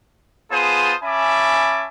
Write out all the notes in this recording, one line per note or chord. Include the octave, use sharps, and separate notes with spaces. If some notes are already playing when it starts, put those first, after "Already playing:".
B3 F4 G#4 C5 A5 D#6
C#4 E5 G#5 A5 B5 D6